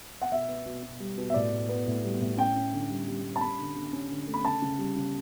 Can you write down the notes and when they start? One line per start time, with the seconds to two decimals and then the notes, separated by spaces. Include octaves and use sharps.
0.21 F#5
0.32 B2 E5
0.48 B3
0.66 B2
0.83 B2
1.00 G3
1.18 B2
1.30 E5
1.34 A2 D5
1.52 A2
1.69 B3
1.87 A2
2.04 G3
2.20 A2
2.37 C#4 G5
2.56 C#4
2.73 D3
2.89 G3
3.08 G3
3.24 G3
3.36 A5
3.41 C#4 B5
3.59 D3
3.76 D3
3.93 C#4
4.10 D3
4.27 A3
4.34 B5
4.45 C#3 A5
4.62 C#3
4.78 G3
4.96 C#3